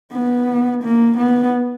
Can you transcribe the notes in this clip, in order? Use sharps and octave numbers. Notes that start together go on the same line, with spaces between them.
B3
A#3
B3